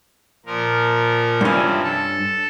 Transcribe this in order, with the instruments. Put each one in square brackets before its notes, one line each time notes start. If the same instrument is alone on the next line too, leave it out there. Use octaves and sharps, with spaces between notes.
[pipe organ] A#2 F3 A#4
[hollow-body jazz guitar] G2 C#4 [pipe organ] C3 E3 F3
[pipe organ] A4 A5